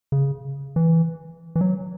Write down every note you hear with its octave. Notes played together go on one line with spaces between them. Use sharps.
C#3
E3
E3
F#3